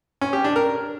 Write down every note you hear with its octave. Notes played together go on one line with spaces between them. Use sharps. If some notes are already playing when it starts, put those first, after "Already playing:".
C#4
G4
D4
A#4